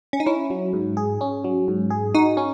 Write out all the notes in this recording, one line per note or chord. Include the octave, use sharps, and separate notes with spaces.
C#4
D#4
C#4 E4
F#3
G#2
G#4
C#4
F#3
G#2
G#4
D#4 F#4
C#4